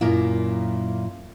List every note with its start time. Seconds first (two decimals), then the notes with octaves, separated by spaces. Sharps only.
0.01 F#2 A#2 A#3 E4 F4